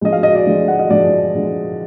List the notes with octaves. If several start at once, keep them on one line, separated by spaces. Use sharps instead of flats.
D3 F3 G#3 D#5
F5
D#5
D5
D3 F3 G#3
F#5
D#5
D3 F3 G#3 D5
D3 F3 G#3